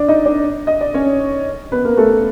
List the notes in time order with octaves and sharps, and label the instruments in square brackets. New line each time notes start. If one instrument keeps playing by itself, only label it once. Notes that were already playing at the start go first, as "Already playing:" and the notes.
Already playing: [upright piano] D4 D5
D#4 D#5
D4 D5
D#5
D5
C#4 C#5
B3 B4
A#3 A#4
A3 A4